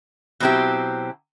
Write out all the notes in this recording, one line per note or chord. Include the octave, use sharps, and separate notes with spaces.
B2 F#3 C4 E4 G4